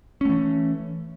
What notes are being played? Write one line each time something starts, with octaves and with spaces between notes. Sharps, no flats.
E3 A3 C#4